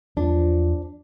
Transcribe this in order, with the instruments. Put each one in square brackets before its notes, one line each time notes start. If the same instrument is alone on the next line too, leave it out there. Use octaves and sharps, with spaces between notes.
[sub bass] E2 [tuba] F3 [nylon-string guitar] D4